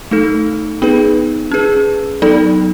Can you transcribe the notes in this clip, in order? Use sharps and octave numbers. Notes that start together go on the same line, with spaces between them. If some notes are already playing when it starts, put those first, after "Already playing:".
A3 D#4 A4
B3 D#4 G#4 B4
C#4 G#4 B4
F#3 B3 D#4 A4